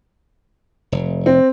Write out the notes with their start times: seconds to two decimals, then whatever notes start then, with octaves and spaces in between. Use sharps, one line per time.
0.92 F1
1.26 C4